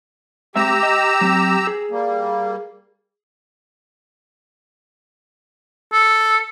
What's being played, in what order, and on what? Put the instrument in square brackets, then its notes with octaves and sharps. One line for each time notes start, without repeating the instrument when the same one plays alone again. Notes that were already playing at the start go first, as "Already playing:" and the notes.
[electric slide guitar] G#3 C4 E5 [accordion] G4 A#5 E6
[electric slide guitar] D#5
F#3 C4
G#4
[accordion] G3 A#3
[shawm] A4